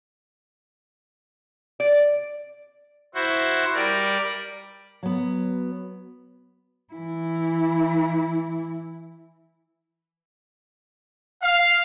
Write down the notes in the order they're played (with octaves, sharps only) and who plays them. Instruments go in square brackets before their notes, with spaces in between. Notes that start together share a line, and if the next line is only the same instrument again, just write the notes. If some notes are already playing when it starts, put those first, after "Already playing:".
[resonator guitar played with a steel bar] D5
[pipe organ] E4 F#4 C5
G3 A#4 D5
[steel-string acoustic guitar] F#3 B3
[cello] E3 E4
[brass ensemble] F5